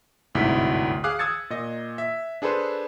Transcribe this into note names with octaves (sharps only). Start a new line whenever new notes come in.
G1 D2 G#2 C3 E4 B6
G#4 F5 D6 D#6 F#6
D#6 E6 G#6 A6 C#7
A#2 D#5
E5
D4 G#4 A4 B4 C5